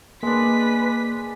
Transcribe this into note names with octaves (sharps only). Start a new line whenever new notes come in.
G#3 A#3 D4 B4 B6